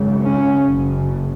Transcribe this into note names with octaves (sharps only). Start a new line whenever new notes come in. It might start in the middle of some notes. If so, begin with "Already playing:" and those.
Already playing: G#1 F#2 C#3
C#4
F#1 F#2 C#3